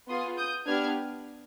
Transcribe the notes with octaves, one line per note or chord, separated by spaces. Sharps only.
B3 F4 G#4 C6 D#6
D#6 G6
B3 D4 G4 F6 G#6